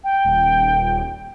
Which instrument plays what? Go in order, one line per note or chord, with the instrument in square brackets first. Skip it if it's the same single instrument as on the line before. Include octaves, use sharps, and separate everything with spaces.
[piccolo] G5
[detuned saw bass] D#1